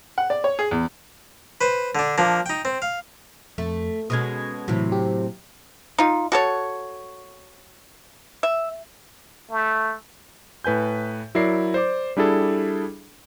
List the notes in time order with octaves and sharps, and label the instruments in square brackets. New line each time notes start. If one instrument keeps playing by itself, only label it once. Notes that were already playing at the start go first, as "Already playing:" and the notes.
[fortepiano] F#5
D5
C#5
G#4
E2
[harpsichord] B4 C5
D3 D4
F3 A#3 D4
D#4 G5
C4
F5
[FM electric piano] F2 [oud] A3
[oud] B2 G#3 C#4 [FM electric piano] D#6 G#6
[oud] A2 C3 [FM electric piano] E3 F#3
[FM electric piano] F#3 G4
[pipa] D#4 F4
F#4 A4 C#5
E5
[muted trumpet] A3
[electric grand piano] A2 B4 G#5 G6
F#3 E4 A#4 D5 C7
C5 D5 D6
G3 D4 E4 G#4 A4